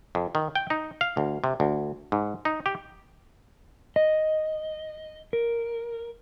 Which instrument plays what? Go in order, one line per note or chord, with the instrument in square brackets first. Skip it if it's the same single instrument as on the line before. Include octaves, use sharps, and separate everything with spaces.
[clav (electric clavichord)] F2
D#3
G5
D#4
F5
D2
C3
D2
G#2
D#4
G4
[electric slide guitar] D#5
A#4